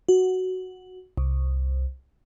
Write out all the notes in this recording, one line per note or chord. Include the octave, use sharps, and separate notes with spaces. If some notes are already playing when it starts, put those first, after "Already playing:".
F#4
C2